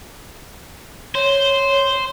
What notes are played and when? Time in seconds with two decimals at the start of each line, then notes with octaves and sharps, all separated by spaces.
1.15 C5 C#5